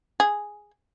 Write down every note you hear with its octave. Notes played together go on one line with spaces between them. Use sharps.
G#4